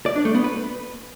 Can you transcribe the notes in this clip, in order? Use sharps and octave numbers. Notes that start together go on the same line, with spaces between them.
D5
D4
A3
B3
B4